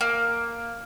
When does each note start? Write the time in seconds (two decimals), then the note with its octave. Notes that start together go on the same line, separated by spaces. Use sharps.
0.01 A#3